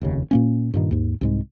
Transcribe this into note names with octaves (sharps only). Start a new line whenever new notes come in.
F1 D#2 C#3
A#2 A#3 C#4
G2 A#2 D#3
D#2 G#2
C2 G#2 G#3